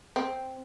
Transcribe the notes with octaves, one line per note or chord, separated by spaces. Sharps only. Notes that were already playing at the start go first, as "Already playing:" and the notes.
C4